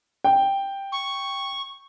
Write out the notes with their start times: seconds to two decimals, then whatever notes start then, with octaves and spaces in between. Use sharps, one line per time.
0.24 G5
0.92 C#6